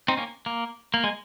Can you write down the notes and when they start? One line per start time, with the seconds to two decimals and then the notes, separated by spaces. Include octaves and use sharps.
0.08 C4 D#4
0.17 A#3 C#4
0.46 A#3
0.94 A#3
1.04 G#3